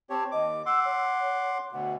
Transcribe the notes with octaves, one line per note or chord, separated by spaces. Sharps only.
C4 G4 C#5 A5
D#2 D#5 D6
F#5 C6 D6 E6
C#5
D2 B2 F#5